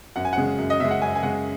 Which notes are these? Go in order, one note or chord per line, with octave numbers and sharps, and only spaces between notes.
F#2 F#5
G#5
C#3 G#3 F#5
F#2
D#5
C#3 G#3 E5
F#5
F#2 G#5
G#5
C#3 G#3 F#5